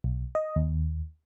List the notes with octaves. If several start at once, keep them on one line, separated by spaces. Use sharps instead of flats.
B1
D#5
D#2